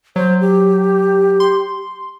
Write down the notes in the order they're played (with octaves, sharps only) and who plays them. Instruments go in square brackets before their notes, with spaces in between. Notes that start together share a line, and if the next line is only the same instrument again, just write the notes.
[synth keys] F#3 [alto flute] C5
[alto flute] G4
[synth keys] C6